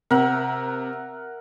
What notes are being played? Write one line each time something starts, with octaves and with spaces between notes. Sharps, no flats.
C3 A#4 E5 F#5